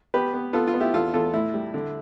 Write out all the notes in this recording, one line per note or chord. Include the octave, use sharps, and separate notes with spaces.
B3 G4 B4
B3
B3 F4 A4
F4
B3
E4 G4
E2 F4 A4
E2 F4 A4
A2 E4
G3
D3